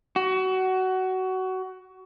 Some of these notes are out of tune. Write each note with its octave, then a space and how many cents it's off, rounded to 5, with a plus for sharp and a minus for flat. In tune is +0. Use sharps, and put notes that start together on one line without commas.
F#4 +20